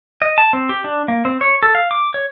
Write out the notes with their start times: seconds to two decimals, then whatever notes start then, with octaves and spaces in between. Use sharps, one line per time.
0.22 D#5
0.38 A5
0.53 C4
0.69 G4
0.84 D4
1.08 A#3
1.25 C4
1.41 C#5
1.63 A4
1.75 F5
1.91 D6
2.14 C#5